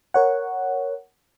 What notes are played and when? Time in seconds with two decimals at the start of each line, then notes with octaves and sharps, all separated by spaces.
0.14 A#4 C#5 F#5